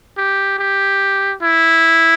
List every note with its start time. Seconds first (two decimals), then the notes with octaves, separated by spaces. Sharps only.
0.18 G4
0.59 G4
1.43 E4